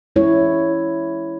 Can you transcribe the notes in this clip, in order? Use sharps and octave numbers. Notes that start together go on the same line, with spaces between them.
G#3 E4 C#5